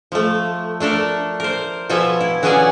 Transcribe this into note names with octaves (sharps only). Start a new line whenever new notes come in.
F3 A3
A3 D4 A4 A#4
A#4 C5
B2 F3 A4 E5 G#5
E4
E3 F#3 B3 C#4 G#4 D5